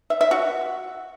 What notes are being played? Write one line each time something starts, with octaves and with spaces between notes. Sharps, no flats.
E5
E5
F#4